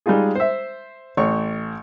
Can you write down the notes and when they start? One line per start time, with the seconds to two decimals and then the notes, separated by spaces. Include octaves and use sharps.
0.06 G3 G#3 D#4 F4 G#4
0.35 C5 E5
1.17 A1 C#5 C#6